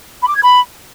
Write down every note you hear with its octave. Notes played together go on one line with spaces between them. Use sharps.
B5
D6
G#6
B5